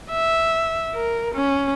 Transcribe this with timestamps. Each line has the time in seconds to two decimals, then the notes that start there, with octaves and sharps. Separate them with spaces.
0.10 E5
0.95 A#4
1.34 C#4